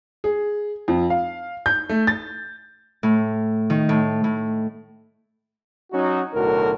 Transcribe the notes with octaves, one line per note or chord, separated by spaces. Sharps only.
G#4
F2
F5
G6
A3
A6
A2
D#3
A2
A2
F#3 C#4 D#4 F#4
B1 A2 D3 F#4 A#4